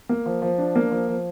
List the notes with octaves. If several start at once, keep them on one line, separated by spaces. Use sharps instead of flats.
A#3
F3
F3
D4
A#3
F3
F3